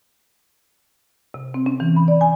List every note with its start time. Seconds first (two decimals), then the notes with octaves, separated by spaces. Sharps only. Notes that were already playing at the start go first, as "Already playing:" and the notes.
1.34 C3
1.54 C4
1.66 C#4
1.80 E3
1.96 B5
2.08 D5
2.21 G#5